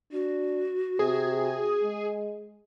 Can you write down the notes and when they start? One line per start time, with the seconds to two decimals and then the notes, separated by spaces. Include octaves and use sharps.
0.12 D4 F#4
0.99 C3 G#4
1.83 G#3